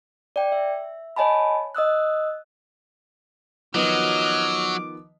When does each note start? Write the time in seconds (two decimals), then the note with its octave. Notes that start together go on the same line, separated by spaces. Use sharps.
0.36 D5 G5
0.52 E5
1.16 C#5 D#5 G#5 A5 B5
1.75 D#5 D#6 E6 F#6
3.75 D#3 F3 F#3 B3 D#5 D6 F6